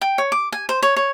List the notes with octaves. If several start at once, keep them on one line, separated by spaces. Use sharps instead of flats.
G5
C#5
D6
G#5
C5
C#5
C#5